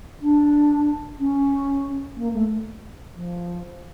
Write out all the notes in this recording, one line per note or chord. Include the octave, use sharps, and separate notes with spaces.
D4
C#4
A#3
A3
F3